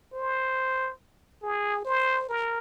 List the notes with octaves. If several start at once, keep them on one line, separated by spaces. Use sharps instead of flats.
C5
G#4
C5
A#4